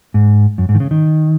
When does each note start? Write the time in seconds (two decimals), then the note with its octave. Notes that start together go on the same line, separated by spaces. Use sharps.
0.14 G#2
0.58 F#2
0.69 G#2
0.75 D#3
0.80 C#3
0.91 D#3